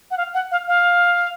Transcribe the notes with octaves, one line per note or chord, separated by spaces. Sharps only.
F#5
F5
F#5
F5
F5